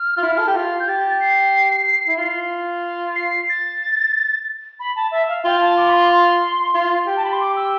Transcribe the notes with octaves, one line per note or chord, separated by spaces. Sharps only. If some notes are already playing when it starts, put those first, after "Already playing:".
Already playing: F6
F4
E4
A4
G4
F4
G6
G4 A6
C7
E4
F4
C7
A6
B5
A5
E5
F5
F4 G5
A5
D6
B5
C6
C6
F4
G4
A5
B5
C6
D6
E6